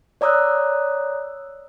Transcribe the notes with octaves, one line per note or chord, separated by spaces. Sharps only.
C#5 D5 A#5 D#6 E6 F#6